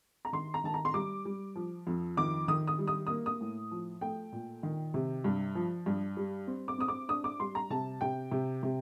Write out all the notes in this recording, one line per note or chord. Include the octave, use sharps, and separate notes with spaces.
A#5
D#3 C6
A#5
D#3 A5
A#5
C6
G3 D6
G3
F3
F2
D#3 D6
D#3 D#6
D#6
G3
D#6
A#3 D#6
D#6
A2
F3
A3 G5
A#2
D#3
C3
G2
F3
G2
G3
C4
D6
C4 D#6
D6
D4 D#6
D6
G3 C6
A#5
C3 A5
C3 G5
C3
C3